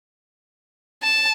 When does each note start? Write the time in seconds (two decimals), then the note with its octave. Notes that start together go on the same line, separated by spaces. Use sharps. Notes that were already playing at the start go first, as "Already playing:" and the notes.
1.03 A5